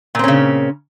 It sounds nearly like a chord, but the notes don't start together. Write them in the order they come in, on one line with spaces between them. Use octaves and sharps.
A#2 C4 C#4 C#3